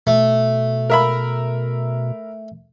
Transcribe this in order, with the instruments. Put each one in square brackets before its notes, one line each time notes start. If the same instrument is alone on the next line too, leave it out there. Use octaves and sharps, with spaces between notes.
[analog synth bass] B2 [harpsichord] A3
[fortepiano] A#4 E5 B5